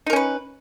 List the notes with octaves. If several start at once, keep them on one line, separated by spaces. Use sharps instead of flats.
C#4 D#4 A#4 B4